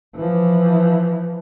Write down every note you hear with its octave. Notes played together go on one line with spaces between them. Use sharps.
E3 F3